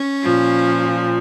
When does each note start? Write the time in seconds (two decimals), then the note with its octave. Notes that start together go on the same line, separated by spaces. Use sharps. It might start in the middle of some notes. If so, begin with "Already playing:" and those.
Already playing: C#4
0.24 A#2 F3